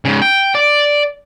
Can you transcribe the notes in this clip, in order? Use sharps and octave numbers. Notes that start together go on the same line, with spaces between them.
G#2 C#3
G5
D5